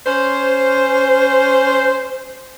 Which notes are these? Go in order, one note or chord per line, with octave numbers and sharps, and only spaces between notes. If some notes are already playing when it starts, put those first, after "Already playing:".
C#4 C5